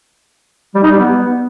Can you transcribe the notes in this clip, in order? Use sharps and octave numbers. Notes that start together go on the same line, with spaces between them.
G3
D#4
G3
B3